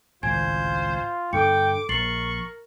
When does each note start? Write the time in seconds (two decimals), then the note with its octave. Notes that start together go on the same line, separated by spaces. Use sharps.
0.23 G#1 C#2 A2 F4 C5 G#5 G#6
1.33 G2 D3 A4 G5 D6 C#7
1.89 A#1 A#4 C#6 A6 C7 F#7